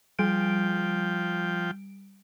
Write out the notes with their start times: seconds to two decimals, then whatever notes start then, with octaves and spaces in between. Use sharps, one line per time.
0.19 F3 G3 G5 D7